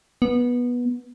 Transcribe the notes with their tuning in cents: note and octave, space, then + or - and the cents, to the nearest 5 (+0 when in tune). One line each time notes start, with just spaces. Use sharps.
B3 -15